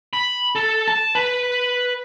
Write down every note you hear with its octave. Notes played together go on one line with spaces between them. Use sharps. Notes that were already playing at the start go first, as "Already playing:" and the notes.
B5
A4
A5
B4